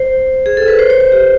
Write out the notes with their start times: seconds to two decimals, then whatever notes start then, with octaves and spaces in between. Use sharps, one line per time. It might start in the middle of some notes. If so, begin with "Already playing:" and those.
Already playing: C5
0.46 G#4
0.57 A4
0.68 B4
0.79 C5
0.90 C#5
1.00 C5
1.12 G4